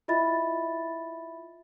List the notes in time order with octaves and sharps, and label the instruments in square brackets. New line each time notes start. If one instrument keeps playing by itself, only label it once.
[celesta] E4 F4 D#5 E5 B5 A6